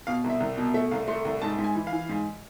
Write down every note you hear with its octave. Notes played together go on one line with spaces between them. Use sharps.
B2 F5
C2
E5
C2
B2
A3 E5
C2 F5
A3 C6
C2
G#2 A5
G#2
G#5
E3
F5
E3
G#2